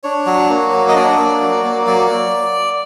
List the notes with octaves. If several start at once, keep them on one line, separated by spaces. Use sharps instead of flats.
D4 C#5
F#3
A#3
F#3
D#5
D4 D5
A#3
F#3
A#3
F#3 D5